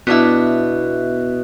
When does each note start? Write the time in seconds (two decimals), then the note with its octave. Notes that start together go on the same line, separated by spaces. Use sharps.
0.07 B2 B3 D4 E4 E5